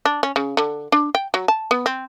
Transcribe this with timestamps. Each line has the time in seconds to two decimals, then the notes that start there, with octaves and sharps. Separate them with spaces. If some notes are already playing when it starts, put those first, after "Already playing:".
0.05 D4
0.23 C#4
0.36 C#3
0.57 D3
0.92 D4
1.15 G5
1.34 F#3
1.48 A5
1.71 B3
1.86 C4